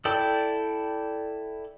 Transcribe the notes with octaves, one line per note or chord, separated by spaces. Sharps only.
E4 A4 D5 G5 E6